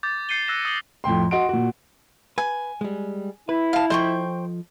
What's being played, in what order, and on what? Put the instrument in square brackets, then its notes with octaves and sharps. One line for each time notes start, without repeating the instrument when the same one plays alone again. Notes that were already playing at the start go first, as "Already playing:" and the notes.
[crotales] D6 G6 A6
G6 C7 C#7 D#7 G7
E6 F#6 A#6 E7
D#6 F#7 G7
[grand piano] F2 A2 G5 C6
F#4 D#5 F#5 C6 D7
A#2 F#4
[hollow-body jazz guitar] B4 [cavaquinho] G#5
[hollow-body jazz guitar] G3 G#3
[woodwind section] E4 [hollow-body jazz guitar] B4
[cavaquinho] F5 A5
[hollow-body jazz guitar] F3 A4 D#5 [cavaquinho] C5 G5 C#6